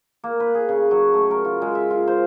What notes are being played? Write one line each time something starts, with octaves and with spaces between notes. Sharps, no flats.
A#3
B4
G#4
C#3
F#3
A3
A#4
F4
G#3
E5
F4
C5